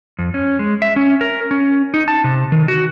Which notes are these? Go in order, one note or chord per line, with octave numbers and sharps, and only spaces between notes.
F2
C#4
G#3
E5
C#4
A#4
C#4
D#4
A5
C3
D#3
F#4